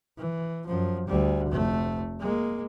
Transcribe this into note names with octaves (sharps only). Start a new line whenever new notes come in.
E3
F#2 F3
D2 G3
F1 A3
G#3 A#3